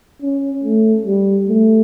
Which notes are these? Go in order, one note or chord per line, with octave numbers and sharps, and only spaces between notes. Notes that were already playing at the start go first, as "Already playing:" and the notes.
C#4
A3
G3
A3